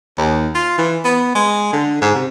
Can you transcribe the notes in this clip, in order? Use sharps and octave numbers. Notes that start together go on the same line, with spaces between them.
D#2
F4
E3
B3
G#3
D3
G#2
C3